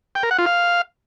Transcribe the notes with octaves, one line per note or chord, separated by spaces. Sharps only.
G5
A#4
F#5
F4
F5